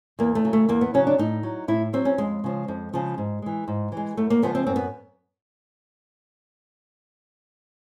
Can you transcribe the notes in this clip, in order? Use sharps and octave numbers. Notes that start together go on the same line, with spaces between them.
E2 A#3
A3
C#3 F#3
A3
E2 A#3
B3
C#3 F#3 C#4
D4
A2 D#4
F#3
A2 E4
F#3 C4
C#4
F2 G#3
C#3 F3
F2
C#3 F3
G#2
E3 G#3
G#2
E3 G#3
F#2 A3
A#3
C#3 F3 G#3 B3
C4
F#2 C4
B3